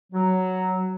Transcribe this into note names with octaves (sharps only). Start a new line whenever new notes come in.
F#3